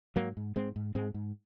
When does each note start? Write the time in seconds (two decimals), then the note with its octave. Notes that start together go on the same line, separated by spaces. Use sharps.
0.16 G#2 F#3 A#3
0.37 G#2
0.56 G#2 G#3 C4
0.76 G#2
0.95 G#2 G#3 C4
1.14 G#2